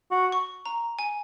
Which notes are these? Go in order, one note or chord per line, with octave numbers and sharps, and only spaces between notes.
F#4
C#6
A#5
G#5